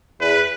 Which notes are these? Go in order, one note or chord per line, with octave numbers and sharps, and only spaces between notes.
E2 B4